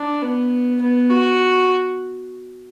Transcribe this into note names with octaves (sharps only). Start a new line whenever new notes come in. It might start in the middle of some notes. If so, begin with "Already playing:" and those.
Already playing: D4
B3
B3
F#4